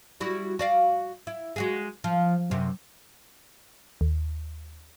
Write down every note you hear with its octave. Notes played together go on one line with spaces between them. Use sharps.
G3 E4 F#4
F#4 D5 F5
E4
G#3 F#4 G#4
F3
F#2 C3
D#2